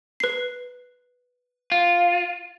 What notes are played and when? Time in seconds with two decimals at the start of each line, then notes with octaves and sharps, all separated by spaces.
0.20 B4 C7
1.72 F4